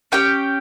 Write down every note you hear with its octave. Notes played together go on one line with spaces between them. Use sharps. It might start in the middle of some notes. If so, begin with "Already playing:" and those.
C#4 G4 G5